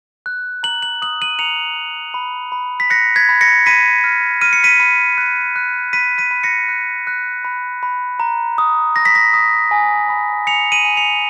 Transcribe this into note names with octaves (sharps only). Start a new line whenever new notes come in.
F#6
A#5 F#7
F#7
D#6 F#7
D#7 F#7
A#5 C#7 F7
A#5
B5
B5
B6
F#6 A#6 C#7
G#6 B6
B5
A#6 C#7
B5 B6 D#7
F6
F6 D#7
C#7
B6 D#7
B5
F#6
F#6
B5 B6 D#7
B6 D#7
B5
A#6 C#7
F#6
F#6
B5
B5
A#5
D#6
D#6 A#6
B6
A#6
D#6
G#5
B5
G#5 C#7 F7
D#7 F#7
G#5
C#7 F7